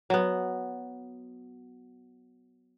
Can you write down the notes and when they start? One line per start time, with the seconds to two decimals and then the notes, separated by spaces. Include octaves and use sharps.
0.10 F#3 B3